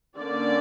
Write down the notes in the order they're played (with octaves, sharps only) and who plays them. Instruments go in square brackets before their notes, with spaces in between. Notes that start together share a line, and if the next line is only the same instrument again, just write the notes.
[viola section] D3 A#3 C#4 D5